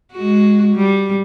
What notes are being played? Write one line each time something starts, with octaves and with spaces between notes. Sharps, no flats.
G#3 F#4
G3